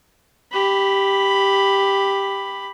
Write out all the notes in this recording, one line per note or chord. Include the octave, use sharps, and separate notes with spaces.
G4 B5